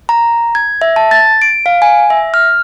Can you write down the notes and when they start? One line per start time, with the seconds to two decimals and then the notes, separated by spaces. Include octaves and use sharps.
0.09 A#5
0.55 G#6
0.81 E5
0.96 A5
1.11 A6
1.42 D7
1.66 F5
1.82 G#5
2.10 E5
2.34 F6